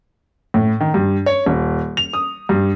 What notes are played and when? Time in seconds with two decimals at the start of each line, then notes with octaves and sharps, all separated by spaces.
0.54 A2
0.81 D#3
0.94 G2
1.26 C#5
1.46 D#1
1.97 F7
2.13 D#6
2.49 G2